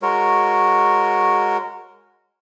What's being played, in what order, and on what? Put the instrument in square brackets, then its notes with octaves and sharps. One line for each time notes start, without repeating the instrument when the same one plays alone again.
[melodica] G#3 F#4 A#4 C#5